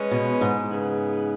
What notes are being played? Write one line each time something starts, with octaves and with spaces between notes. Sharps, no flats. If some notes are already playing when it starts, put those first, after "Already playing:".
Already playing: G#3 C#4 B4 D#5
B2
G#2
C#3 B3 G#4 B4